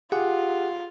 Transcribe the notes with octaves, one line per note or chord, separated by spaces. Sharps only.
F4 G4 G#4 F#5